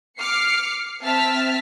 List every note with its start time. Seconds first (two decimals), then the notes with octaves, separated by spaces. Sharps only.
0.18 D6 F6 C7 C#7
1.03 C4 E5 A5 F6 B6